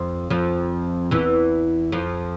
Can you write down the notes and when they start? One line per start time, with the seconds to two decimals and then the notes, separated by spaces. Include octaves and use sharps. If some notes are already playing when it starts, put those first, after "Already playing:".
Already playing: F2 F3
0.30 F2 F3
1.11 E2 E3
1.92 F2 F3